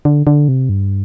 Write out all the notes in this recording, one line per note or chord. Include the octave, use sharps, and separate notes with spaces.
D3
D3
C3
G2